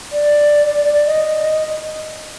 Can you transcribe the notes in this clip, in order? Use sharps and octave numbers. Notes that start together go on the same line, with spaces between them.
D5
D#5